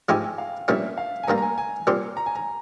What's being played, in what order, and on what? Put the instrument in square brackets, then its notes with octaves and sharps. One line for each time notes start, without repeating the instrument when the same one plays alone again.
[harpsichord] G#2 F3 G#3 E4 G4 [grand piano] G#5
[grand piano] G5
F5
[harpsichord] A#1 A#2 G3 C#4 [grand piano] E5
[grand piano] F5
G#5
[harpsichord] G2 G3 A#3 [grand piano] A#5
[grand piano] A#5
G#5
G#5
[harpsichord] A#2 G3 C4 G4
[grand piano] A#5
G#5
A#5